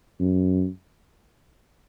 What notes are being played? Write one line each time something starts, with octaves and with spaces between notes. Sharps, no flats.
F#2